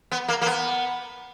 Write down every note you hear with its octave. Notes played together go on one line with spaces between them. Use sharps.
B3
A#3
A#3
B3